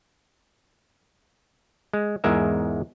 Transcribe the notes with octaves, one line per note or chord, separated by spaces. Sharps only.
G#3
E2 G#2 G#3 A#4 E5